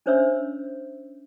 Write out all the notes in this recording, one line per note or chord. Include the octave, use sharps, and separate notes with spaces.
C#4 D4 C5 C#5 E5 E6